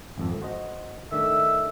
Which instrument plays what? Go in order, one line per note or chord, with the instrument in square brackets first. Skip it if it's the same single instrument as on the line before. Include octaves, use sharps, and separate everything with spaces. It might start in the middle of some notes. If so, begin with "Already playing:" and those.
[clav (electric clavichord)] G#1 F2 A4
F#4 C5 D#5
[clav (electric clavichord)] D#3 A3 D4 [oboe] E5